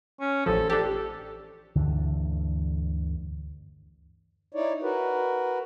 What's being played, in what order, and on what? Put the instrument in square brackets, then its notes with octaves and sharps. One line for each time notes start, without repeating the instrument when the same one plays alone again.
[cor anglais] C#4
[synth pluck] A1 F3 [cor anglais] A4
[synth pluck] D4 G4 [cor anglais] A4
[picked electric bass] G1 D2 D3 E3
[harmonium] D#4 E4 C#5 D5
F#4 A#4 B4